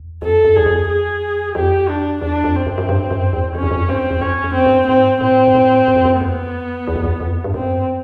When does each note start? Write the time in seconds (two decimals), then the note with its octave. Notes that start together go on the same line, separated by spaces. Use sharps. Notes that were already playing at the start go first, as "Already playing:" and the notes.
Already playing: E2
0.22 F2 A4
0.45 F#2
0.56 E2 G#4
0.66 F2
0.89 G#4
1.55 F2 G4
1.89 D4
2.22 E2 D4
2.44 F2
2.55 C4
2.66 F#2
2.78 F#2
2.89 G2
3.11 F#2
3.33 E2
3.55 F2 C#4
3.63 E2
3.71 F2
3.88 G2 C4
4.10 E2
4.21 F2 C#4
4.44 F2
4.55 C4
4.66 G2
4.88 G#2 C4
5.21 A2 C4
5.48 G#2
5.55 A2
5.88 F#2
5.96 F2
6.05 F#2
6.21 F2 B3
6.88 E2
6.96 F2
7.04 E2
7.20 F2
7.44 G2
7.54 F#2 C4